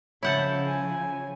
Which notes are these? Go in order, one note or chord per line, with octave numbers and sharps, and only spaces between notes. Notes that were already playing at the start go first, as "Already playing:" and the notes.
C#3 F3 E4 C#5 F#5 A5 G6
G#5